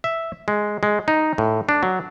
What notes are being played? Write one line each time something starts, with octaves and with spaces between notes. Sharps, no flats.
E5
G#3
G#3
D#4
A2
D4
F#3